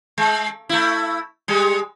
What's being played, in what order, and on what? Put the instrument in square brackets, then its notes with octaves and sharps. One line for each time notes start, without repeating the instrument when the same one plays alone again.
[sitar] G#3
A3 E4
G3 G#3